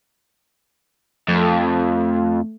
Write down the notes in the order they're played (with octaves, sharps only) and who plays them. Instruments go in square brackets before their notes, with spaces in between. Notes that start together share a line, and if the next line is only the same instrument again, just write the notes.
[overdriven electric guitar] F2 [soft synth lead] A3